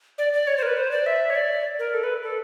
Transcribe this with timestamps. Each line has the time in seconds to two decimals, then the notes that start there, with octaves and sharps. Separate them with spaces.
0.18 D5
0.33 D5
0.47 C#5
0.58 C5
0.63 A#4
0.67 B4
0.77 C5
0.91 D5
1.06 E5
1.30 C#5
1.35 D5
1.79 A#4
1.94 A4
2.03 B4
2.23 A4